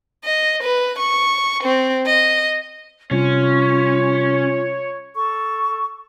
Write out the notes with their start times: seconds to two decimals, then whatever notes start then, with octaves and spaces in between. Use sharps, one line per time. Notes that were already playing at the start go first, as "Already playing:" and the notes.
0.24 D#5
0.63 B4
0.99 C#6
1.63 C4
2.06 D#5
3.11 C3 G3 C#4 F4 C#5
5.15 A4 C#6